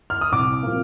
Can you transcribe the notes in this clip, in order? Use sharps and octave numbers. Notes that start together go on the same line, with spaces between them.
F6
D#6
C2 D6
C3 F3 A#3